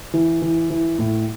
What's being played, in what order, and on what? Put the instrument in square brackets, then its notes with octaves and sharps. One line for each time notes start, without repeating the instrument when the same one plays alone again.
[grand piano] E3
E3
E3
A2